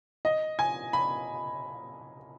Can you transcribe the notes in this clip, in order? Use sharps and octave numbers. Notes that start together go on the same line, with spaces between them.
D#5
G#5
B5